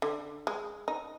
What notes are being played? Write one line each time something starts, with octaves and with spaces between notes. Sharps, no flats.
D3
G#3
D#4